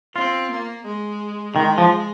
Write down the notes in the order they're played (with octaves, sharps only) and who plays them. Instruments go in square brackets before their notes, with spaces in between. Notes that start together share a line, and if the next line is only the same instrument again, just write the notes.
[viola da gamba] C4 [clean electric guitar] F4
[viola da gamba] A#3
G#3
[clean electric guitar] D#3 [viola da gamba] G#3
[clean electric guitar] F3